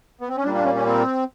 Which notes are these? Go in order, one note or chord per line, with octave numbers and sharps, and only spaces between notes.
B3
C4
C#4
A#2 G3 A#3 D4
D4
C#4
C#4
C4